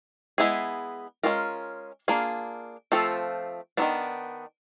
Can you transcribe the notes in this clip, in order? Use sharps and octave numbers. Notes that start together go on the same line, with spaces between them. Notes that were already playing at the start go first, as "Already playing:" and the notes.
G#3 B3 E4 G#4
G#3 C#4 F4 A#4
A#3 D4 F4 G#4
F3 A3 C4 F4 A4
D#3 F#3 B3 D4